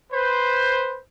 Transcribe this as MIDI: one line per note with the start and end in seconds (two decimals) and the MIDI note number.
0.11 0.99 71
0.11 0.99 72